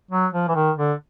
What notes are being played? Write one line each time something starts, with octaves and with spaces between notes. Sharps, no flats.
F#3
F3
E3
D#3
D3